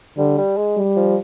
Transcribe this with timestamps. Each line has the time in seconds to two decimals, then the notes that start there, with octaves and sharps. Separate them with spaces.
0.17 D3 G3
0.38 G3
0.57 G#3
0.77 G3
0.96 F3